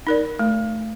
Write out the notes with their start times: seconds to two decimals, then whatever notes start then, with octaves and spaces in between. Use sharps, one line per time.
0.07 D#4 A#4 D5
0.39 A3